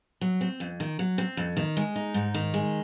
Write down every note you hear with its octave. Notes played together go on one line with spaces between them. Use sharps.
F#3
C4
F2
D#3
F#3
C4
F2
D#3
G#3
D#4
G#2
D#3
G#3